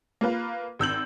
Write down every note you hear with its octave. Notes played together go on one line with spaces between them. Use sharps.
A#3 F4 B4 F5
G#1 E6 G6 F#7